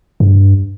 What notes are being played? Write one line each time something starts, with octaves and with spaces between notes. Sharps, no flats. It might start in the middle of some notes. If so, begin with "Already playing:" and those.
G2